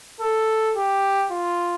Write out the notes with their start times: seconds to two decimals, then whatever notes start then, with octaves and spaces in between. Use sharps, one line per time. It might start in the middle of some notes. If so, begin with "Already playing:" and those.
0.21 A4
0.76 G4
1.31 F4